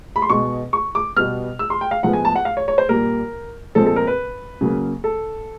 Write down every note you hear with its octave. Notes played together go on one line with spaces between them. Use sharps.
B5
C6
B2 G#3 B3 C#6
C#6
D6
B2 G3 B3 F6
E6
C6
G5
F5
A2 F3 G#3 B3 F#5
G#5
A5
F#5
F5
C#5
C#5
C5
A#2 G3 A#3 A#4
A#2 F3 G#3 C4 A4
A4
A#4
B4
C#3 F#3 A#3
A4